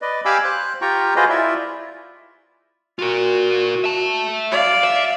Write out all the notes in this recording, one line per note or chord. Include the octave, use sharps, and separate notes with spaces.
B4 D5 D#5
G4 F5 G#5 B5 D6 E6
C5 F#6
F4 G4 G5 A#5 C#6
F4 F#4 G#4 B4 C5 D#5
E4 F4 D5 E5
F4 F#4 A#4
E5 A5
D5 F5
E5